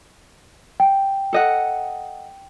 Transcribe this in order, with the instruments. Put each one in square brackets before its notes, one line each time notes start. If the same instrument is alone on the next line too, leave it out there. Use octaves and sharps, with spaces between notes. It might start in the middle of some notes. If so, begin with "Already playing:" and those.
[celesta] G5
[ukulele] A4 D#5 F#5